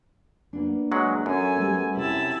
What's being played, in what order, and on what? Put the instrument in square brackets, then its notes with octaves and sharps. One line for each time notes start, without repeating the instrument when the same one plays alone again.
[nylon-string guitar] A#3 B3 D4
[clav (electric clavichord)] F#3 G#3 F#5
[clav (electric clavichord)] F#2 [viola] A4 G#5
[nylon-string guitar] G3 A3 B3
[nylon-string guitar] C3 [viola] E4 A5